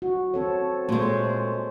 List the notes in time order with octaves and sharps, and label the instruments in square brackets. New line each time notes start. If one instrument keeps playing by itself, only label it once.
[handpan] F#4
C4 A4 C#5
[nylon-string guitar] A#2 G#3 [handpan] A3 C5 C#5